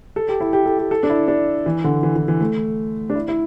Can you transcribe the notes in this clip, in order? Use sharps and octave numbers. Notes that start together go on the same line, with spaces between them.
A4
G4
E4
G4
A4
G4
A4
D4
E4
D4
E3
D3
E3
E3
E3
A3
D4
E4
E4